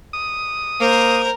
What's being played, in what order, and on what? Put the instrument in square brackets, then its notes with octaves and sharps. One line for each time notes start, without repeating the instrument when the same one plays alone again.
[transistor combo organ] D#6
[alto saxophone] A#3 [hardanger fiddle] A#4 [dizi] C5